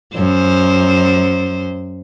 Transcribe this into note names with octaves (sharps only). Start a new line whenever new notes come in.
F#2 C5